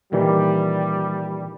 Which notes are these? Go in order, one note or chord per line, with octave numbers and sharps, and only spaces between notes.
A#2 D#3 E3 G3